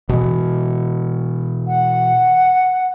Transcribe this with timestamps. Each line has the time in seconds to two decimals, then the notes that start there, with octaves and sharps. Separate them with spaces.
0.09 B2 E3
1.67 F#5